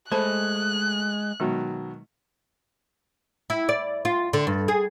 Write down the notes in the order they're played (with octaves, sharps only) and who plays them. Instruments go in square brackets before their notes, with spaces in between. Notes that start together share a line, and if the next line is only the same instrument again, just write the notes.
[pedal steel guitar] G#3 [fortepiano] A3 [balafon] C5 A5 B5 [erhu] F#6
[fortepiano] B2 D#3 F#3 [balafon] G#3
[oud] E4
D5
F4
D3
G2
G#4